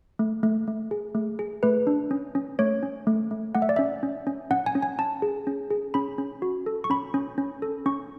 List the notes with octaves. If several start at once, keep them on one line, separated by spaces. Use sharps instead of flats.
A3
A3
A3
G#4
A3
G#4
A3 B4
D4
C#4
C#4
A3 C#5
C#4
A3
A3
A3 F#5
E5
D5
C#4 E5
C#4
C#4
C#4 F#5
G#5
C#4
G#5
C#4 A5
G#4
C#4
G#4
C#4 B5
C#4
F#4
A4
C#6
C#4 B5
C#4
C#4
A4
C#4 C#6